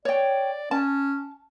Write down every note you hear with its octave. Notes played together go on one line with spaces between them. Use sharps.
C#5 D5 G5
C#4 A5